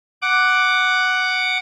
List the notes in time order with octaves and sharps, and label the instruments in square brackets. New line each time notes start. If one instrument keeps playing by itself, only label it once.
[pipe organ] F#5 D6